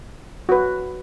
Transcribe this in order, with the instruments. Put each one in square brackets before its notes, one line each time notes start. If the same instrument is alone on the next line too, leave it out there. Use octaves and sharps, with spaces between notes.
[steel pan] F#4 B4